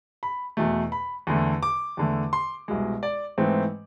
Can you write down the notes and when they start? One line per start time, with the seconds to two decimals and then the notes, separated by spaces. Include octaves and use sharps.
0.23 B5
0.57 E2 B2 A3
0.92 B5
1.27 E2 D3 A3
1.63 D6
1.97 E2 D3 A3
2.33 C6
2.68 C2 B2 G#3
3.03 D5
3.38 G#2 E3 A3 C4